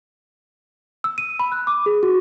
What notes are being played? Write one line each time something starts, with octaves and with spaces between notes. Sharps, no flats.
E6
D#7
B5
F#6
D6
G#4
F#4